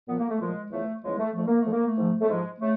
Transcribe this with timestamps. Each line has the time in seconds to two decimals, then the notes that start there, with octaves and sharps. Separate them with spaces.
0.08 A#2 F3 B3
0.19 A#3
0.30 A3
0.40 A#2 F3 G#3
0.71 E2 C#3 F3 A3
1.03 E2 C#3 F3 G#3
1.19 A3
1.34 F2 D3 F3 A3
1.47 A#3
1.60 A3
1.66 F2 D3 F3
1.72 A#3
1.85 A3
1.98 G#2 F3
2.21 A3
2.29 G#2 F3 G#3
2.61 C#3 A3